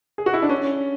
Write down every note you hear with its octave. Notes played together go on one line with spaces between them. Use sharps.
G#4
F#4
E4
D4
C#4